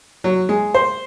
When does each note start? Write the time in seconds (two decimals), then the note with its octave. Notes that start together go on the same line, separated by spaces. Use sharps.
0.24 F#3
0.49 G#3
0.75 C5